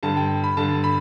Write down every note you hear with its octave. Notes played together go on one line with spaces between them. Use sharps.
G2 D3 A5
G5
B5
G2 D3 A5
B5